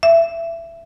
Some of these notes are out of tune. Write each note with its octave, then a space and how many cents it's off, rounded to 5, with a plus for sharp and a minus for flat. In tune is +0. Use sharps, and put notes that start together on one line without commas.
E5 +20